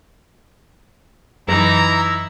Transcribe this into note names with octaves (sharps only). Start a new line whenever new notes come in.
F#2 E3 D#4 E4 A#5